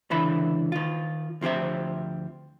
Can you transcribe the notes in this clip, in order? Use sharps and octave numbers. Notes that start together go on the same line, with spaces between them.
C#2 D3 E3 E5 B5
D#3 F4
D2 F3 C4 G4 E5